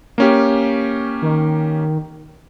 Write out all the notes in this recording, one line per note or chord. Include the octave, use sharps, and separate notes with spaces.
A#3 C#4 G4
D#3